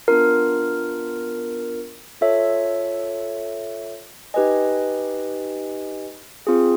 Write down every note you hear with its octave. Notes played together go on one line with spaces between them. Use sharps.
B3 D4 F4 A#4
F4 A4 C#5 E5
D#4 G4 B4 D#5 G#5
C4 F4 G#4